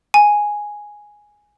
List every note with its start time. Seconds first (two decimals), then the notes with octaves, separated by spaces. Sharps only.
0.14 G#5